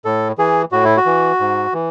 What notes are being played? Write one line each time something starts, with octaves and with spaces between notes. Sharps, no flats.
A2 A4
E3 G#4
A2 F#4
E4
F#4
E3
G#2
E3